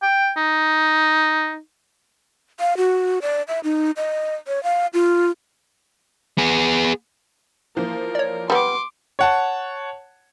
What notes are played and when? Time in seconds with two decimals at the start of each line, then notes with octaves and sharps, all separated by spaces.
0.03 G5
0.37 D#4
2.60 F5
2.77 F#4
3.22 D5
3.48 E5
3.64 D#4
3.97 D#5
4.47 C#5
4.63 F5
4.94 F4
6.38 B3 G#4
7.76 E3 F3 A#3 A#4
8.15 C#5 D5
8.50 G3 B3 C6 D6
9.19 C#5 F#5 A5